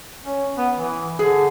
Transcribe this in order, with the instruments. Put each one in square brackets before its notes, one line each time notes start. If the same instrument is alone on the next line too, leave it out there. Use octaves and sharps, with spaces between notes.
[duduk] C#4
B3
E3
[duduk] D3 [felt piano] G#4